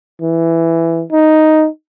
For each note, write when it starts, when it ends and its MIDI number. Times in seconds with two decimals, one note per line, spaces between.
0.22 1.04 52
1.12 1.67 63